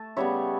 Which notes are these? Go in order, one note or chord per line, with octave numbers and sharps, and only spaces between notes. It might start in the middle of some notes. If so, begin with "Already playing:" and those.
Already playing: A3 A5
C#3 G3 B3 C#5 E5